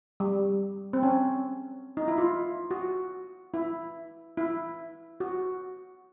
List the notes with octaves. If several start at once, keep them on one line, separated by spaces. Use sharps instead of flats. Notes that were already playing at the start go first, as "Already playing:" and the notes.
G3
C4
C#4
D#4
E4
F4
F#4
E4
E4
F#4